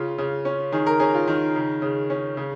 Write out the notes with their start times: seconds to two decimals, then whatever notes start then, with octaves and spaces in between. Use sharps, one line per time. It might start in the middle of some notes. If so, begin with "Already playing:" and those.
Already playing: C#3 F4
0.18 C#3
0.45 C#4
0.72 D#3 G#4
0.86 A#4
1.00 C#4 G#4
1.14 F4
1.27 D#3
1.55 C#3
1.82 C#3
2.10 C#4
2.37 C#3